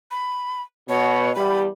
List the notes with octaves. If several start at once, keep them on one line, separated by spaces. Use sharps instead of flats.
B5
B2 C#5
E2 G3 B5